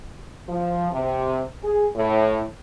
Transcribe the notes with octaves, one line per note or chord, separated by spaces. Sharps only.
F3
C3
G#4
A2